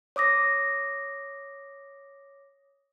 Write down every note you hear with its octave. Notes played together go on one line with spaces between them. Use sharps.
C#5 D6 D#6 A#6